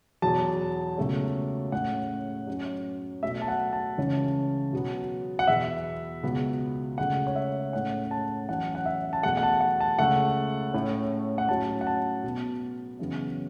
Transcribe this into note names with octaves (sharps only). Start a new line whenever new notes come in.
E2 B2 F#3 B3 A5
C#2 B2 F#3 A3 C#4
A2 A3 C#4 F#5
F#2 F#3 C#4
B2 F#3 A3 E5
A5
F#5
A5
C#2 C#3 E3 C#4
B2 F#3 B3
F#5
E2 B2 B3 E5
C#2 B2 B3
C#2 C#3 A3 F#5
C#5
E5
A2 A3 C#4 F#5
A5
F#2 E3 C#4 F#5
F#5
E5
A5
E2 B2 A3 F#5
F#5
A5
F#5
A5
C#2 C#3 A3 F#5
A2 A3 C#4
F#5
A2 F#3 C#4 A5
F#5
A5
B2 B3
F#2 C#3 E3 B3